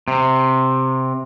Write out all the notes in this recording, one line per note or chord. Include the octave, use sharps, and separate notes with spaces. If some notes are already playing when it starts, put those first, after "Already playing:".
C3